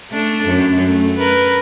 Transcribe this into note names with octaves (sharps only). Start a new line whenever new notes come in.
A3 D4
F#2
A3
A#4 B4